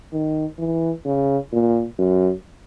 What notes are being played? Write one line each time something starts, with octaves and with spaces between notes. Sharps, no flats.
D#3
E3
C#3
A#2
F#2